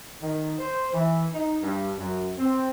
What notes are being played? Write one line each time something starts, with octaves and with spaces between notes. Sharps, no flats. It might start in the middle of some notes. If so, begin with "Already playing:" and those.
D#3
C5
E3
D#4
G2
F#2
C4